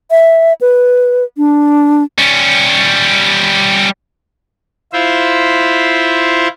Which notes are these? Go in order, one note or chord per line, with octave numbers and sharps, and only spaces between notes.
E5
B4
D4
G3 C#4
E4 F4 C5 E5